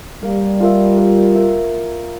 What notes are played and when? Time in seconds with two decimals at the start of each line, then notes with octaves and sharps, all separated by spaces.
0.23 G3 A#3
0.60 F4 A#4 E5
0.97 A#3
1.35 E4 A#4